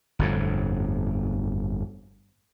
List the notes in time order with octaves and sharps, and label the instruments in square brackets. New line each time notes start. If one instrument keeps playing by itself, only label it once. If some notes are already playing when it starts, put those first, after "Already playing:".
[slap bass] G1 F2 A2